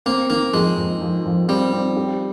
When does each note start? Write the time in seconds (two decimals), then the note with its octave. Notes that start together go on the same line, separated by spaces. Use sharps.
0.06 A#3 C4
0.30 D#3 A#3
0.53 F2 G#3
0.77 F2
1.01 F2
1.25 F2
1.48 G3 C4
1.73 C4
1.97 G4